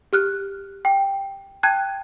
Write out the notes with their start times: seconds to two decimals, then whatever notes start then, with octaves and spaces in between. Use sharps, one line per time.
0.13 G4 F6 F#6
0.85 G5
1.63 G5 A5 F#6 G#6 D#7